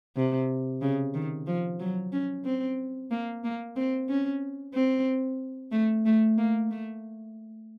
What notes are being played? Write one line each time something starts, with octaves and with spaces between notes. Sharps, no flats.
C3
C#3
D#3
F3
F#3
C#4
C4
A#3
A#3
C4
C#4
C4
A3
A3
A#3
A3